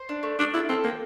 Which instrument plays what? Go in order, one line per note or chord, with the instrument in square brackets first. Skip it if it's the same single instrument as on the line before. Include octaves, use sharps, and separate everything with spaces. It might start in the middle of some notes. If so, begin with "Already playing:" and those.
Already playing: [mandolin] C5
D4
A3
[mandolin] A3 [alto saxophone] D4
[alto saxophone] E4 [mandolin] F4
[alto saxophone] C4 [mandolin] A4
[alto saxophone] A#3 [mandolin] G5